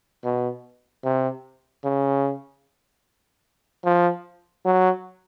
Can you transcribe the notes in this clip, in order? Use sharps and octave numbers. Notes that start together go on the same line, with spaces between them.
B2
C3
C#3
F3
F#3